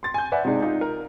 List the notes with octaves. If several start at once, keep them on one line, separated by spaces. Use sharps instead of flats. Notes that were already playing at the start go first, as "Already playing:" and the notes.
C6 A6
G#5 G6
B4 D5 E5 F#5 G#5
C3 G#3 D4 D#4 G#4
D#4 F4
A#4